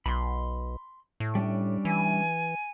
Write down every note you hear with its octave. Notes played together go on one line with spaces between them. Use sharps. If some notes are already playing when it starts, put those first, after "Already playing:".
B1 B5 C6
A2
G3 C#4 D4
E3 G#5